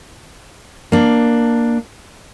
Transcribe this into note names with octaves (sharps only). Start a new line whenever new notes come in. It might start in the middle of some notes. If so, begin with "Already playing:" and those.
A#3 D4